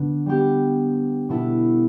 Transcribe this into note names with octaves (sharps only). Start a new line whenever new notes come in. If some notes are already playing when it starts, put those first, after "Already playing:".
Already playing: D3 B3 D4 B4
G3 B3 G4
B2 B3 E4 A4